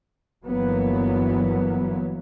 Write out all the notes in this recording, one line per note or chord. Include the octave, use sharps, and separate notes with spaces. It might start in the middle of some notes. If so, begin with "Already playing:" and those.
G1 E3 F#3 A#3 B3